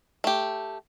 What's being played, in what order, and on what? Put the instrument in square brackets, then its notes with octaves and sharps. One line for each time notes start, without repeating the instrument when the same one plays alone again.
[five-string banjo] A3 G4